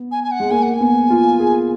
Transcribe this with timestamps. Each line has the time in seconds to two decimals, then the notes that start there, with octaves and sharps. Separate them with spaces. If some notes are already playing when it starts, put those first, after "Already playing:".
Already playing: B3
0.12 G#5
0.24 G#5
0.31 F#5
0.40 G#3
0.51 A#3 G#5
0.63 F#5
0.74 G#5
0.80 B3
1.10 F4
1.40 G#4